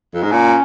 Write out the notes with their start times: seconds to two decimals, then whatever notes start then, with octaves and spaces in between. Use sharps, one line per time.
0.14 F2
0.23 G#2
0.31 A#2 C#4